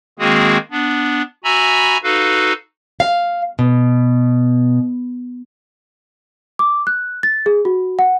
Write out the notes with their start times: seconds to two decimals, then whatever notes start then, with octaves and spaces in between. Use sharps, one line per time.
0.19 D#3 G#3 A#3 C4 F#4 G#4
0.71 B3 D4
1.44 F#4 E5 G#5 A#5 B5 E6
2.04 D#4 F#4 A4 B4 F5
3.00 F5
3.59 B2
6.59 D6
6.87 F#6
7.23 A6
7.46 G#4
7.65 F#4
7.99 F#5